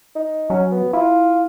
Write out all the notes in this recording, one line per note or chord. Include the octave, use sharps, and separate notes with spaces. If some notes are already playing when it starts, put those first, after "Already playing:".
D#4
F#3 C#4
B3
E4 F4